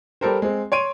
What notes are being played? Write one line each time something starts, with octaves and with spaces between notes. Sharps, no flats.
G3 G4 A4 A#4 C5
G#3 C4
C#5 C6 D7 D#7